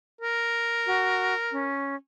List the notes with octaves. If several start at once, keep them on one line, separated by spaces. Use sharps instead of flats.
A#4
F#4
C#4